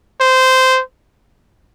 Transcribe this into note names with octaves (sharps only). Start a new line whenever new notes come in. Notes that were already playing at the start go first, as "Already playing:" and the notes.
C5